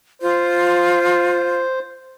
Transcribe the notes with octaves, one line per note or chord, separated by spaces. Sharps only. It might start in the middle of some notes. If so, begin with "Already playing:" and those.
F4 C5